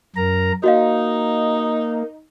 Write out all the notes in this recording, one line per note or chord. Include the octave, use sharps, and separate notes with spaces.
F#2 A#4 A#5
A#3 D#4 F#4 D#5 F5